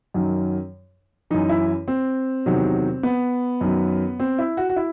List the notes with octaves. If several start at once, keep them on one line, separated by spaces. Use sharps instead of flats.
F#2 D#3 F#3
F#2 E3 D#4
E4
C4
E2 C3 D#3 F#3
B3
F#2 D#3 F#3
C4
E4
F#4
F#4
E4